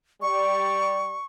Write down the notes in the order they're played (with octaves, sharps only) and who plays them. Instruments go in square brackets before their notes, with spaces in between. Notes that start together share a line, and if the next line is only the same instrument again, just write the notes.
[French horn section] G3 D5 [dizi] C#6